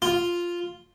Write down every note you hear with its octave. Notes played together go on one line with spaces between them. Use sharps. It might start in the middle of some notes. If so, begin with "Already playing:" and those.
F4